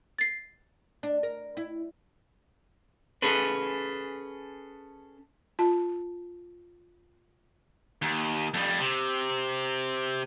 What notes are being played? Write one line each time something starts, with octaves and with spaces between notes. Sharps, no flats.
A6 C7
D4
A#4
E4
C#4 G#4 A4 B4
F4 A5
D#2
F2 G3
C3